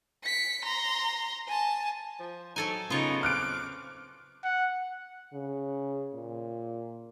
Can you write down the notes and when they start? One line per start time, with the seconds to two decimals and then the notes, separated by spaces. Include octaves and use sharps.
0.24 B6 C#7
0.65 A#5 C6
1.47 G#5 A5
2.20 F3
2.56 F#3 D#4 A4 G#5
2.90 C#3 B3 D#4 F4 C#5
3.23 C4 D6 F6 F#6 D7
4.44 F#5
5.33 C#3
6.14 A#2